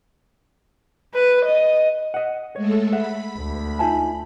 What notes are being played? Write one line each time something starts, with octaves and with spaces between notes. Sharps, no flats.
B4
D#5
D#5 F#5
G#3 A3 A4 C#5
G#4 E5 F#5 B5
D2
D#4 F4 E5 G#5 A5